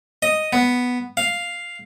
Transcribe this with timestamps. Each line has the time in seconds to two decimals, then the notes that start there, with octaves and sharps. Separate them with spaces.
0.22 D#5
0.53 B3
1.17 F5